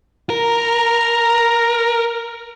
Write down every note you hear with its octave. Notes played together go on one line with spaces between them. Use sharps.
A#4 A#5